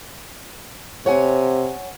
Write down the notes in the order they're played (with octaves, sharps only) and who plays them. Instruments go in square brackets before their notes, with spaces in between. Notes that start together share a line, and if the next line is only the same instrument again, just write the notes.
[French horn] C3 [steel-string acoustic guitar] C#5 F#5 G#5